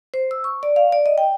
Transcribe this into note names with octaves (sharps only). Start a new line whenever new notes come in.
C5
E6
C#6
D5
F5
D5
D#5
G5